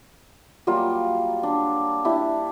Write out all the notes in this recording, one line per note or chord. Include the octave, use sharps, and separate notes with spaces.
F#3 G3 A#3 F4
D4
D4 E4 G4